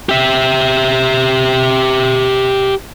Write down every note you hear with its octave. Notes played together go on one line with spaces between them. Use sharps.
G4 E5